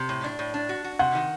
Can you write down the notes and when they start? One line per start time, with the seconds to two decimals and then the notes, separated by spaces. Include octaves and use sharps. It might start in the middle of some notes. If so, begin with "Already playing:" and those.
Already playing: C3
0.09 A2
0.24 D4
0.39 A2
0.54 D4
0.69 F#4
0.84 F#4
0.99 C3 F#5
1.15 D#3